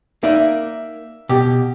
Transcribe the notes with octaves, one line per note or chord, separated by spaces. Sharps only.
A#3 D#4 D5 E5
B2 G4